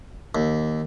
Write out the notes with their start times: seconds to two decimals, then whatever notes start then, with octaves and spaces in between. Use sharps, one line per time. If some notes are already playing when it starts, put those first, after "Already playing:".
0.35 D#2